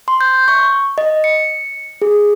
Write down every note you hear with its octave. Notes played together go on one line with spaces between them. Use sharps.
C6
G6
C#6
D#5
C#7
G#4